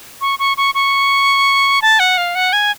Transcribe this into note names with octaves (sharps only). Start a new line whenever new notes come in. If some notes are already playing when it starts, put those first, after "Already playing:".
C#6
C#6
C#6
C#6
A5
F#5
F5
F#5
G#5